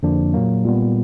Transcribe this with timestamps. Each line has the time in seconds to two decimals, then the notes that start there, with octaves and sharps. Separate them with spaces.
0.03 F2 D3 F3 A#3 D4
0.34 A#2 F#3 A#3
0.65 A#2 G3 B3